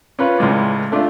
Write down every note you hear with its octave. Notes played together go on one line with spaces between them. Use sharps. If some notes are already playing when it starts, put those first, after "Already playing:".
C#4 F4 B4
C#2 A2 G#3 D5
A3 D4 F4